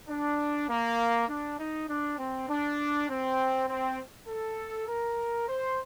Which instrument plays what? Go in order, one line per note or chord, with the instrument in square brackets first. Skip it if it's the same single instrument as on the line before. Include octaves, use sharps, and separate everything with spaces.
[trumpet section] D4
A#3
D4
D#4
D4
C4
D4
C4
C4
A4
A#4
C5